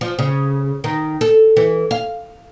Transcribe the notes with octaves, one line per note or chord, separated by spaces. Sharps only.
F3
C#3
D#3
A4
E3
F5